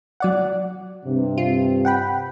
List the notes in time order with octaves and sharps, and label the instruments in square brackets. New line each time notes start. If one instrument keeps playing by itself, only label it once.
[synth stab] F#3 D5 F#5
[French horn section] G2 C3
[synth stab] F4
F#5 G5 B5